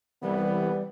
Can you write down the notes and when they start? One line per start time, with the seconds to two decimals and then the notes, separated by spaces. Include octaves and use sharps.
0.22 C2 E3 G3 B3